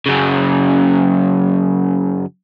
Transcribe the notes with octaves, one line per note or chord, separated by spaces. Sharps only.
F#2 C#3